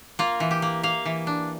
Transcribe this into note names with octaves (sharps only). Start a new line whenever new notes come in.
A#3 F4
E3
G4
A#3
A#3 F5
E3
D4